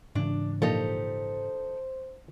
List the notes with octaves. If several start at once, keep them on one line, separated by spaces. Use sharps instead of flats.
G#2 C#3 E3 D4
A#2 F3 D#4 G4 A4 C5